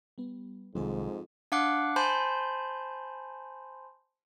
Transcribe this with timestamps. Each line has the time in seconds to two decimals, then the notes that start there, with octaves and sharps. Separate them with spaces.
0.18 G3 B3
0.75 C2 F2 G#2 D#3 F#3 G#3 G#4
1.52 D4 F5 F#5 D6 F#6
1.96 C5 G#5 A5 B5 C6 G6